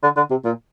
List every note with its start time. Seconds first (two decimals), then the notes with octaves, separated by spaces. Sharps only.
0.03 D3
0.16 D3
0.30 C3
0.44 A#2